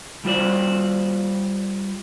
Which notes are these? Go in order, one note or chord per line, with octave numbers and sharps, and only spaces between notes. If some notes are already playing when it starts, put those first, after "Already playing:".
G3 F4 C5 D5